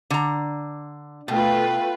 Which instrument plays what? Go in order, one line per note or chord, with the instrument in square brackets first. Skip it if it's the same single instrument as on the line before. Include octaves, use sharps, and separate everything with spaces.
[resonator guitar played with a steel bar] D3 A#5
[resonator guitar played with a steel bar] B2 [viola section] A3 F4 B4 [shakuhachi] G5